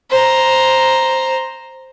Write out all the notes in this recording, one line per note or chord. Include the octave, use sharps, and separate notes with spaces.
C5 A#5